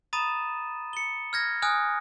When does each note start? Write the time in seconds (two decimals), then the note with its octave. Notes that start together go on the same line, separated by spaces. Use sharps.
0.13 A#5 B5 D#6 A6 D#7 E7
0.93 C#7 G7
1.33 F6 G#6 A#6
1.62 G#5 D#6 F6 F#6